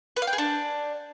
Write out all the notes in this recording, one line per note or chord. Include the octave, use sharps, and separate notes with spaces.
B4
F5
G5
G#4
D4